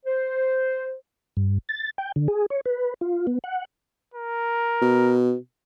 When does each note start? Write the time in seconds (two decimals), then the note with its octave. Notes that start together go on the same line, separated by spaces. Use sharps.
0.05 C5
1.37 G2
1.69 A6
1.98 G5
2.16 D3
2.28 G#4
2.50 C#5
2.65 B4
3.01 F4
3.27 B3
3.44 F#5
4.14 A#4
4.82 B2